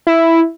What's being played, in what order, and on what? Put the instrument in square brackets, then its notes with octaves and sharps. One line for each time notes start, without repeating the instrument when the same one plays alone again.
[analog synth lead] E4